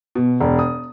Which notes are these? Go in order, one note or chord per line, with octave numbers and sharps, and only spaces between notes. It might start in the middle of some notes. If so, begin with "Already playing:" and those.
B2
E1
D#6